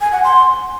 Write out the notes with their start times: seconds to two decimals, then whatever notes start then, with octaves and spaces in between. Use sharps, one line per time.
0.01 G#5
0.12 F#5
0.24 C6